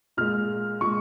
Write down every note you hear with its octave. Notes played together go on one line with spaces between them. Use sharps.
A#2 G#3 F6
A#2 G#3 C#6